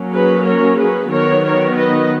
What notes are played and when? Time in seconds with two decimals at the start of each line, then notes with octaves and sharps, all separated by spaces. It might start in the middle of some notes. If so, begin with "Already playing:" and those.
Already playing: F#3 A#3 C#4
0.13 G#4 B4
0.45 A#4 C#5
0.78 G#4 B4
1.11 D#3 F#3 B3 A#4 C#5
1.44 A#4 C#5
1.77 B4 D#5